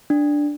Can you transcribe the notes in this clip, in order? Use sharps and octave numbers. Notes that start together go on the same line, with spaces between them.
D4